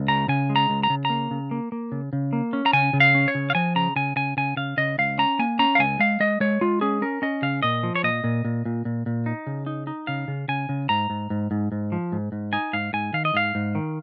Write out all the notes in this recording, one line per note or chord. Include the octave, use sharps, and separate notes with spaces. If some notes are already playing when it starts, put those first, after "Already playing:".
Already playing: C#2
C#3 A#5
C#3 G#5
G#3
A#5
C#2
A#5
C#3
A#5
A#3
C#3
A#3
A#3
C#3
C#3
A#3
C#4
A#5
C#3 G#5
C#3
F5
C#4
C#5
C#3
F5
F3 G#5
C#3 A#5
C#3 G#5
C#3 G#5
C#3 G#5
C#3 F5
C#3 D#5
C#2 F5
C#4 A#5
A#3 G#5
C#4 A#5
F5
C#2 G#5
G#3 F5
G#3 D#5
G#3 C#5
G#3 F4
C#4 G#4
C#4 A#4
C#4 D#5
C#3 F5
A#2 D#5
F3
C#5
A#2 D#5
A#2
A#2
A#2
A#2
A#2
D#4
C#3
D#4
D#4
C#3 F5
C#3
C#3 G#5
C#3
G#2 A#5
G#2
G#2
G#2
G#2
F3
G#2
G#2
D#4 G#5
G#2 F5
G#2 G#5
D#3 F5
D#5
G#2 F5
G#2
D#3